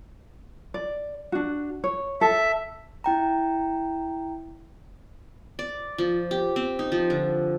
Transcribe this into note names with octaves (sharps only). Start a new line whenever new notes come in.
D5
D4 F#4
C#5
A4 E5
E4 G5 A#5
D5
F3
G4
C4
D#4
F3
D3